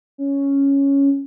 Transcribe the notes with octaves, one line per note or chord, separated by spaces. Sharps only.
C#4